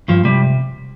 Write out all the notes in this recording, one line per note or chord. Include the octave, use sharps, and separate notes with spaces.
G2 F3
C3 G3